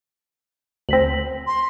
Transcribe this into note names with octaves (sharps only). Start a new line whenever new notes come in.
D2 C4 A#6 B6 F#7
C6